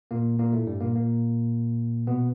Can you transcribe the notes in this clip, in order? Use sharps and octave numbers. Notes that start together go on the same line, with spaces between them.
A#2 A#3
A#2 A#3
A2 A3
G2 G3
A#2 A#3
A#2 A#3
B2 B3